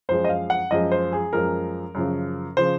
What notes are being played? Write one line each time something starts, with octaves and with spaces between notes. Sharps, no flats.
F#2 F3 G#3 C5
D#5
F5
F#5
F#2 F3 G#3 D#5
C5
G#4
F#2 F3 G#3 A#4
F#2 C#3 F3
C#3 F3 C5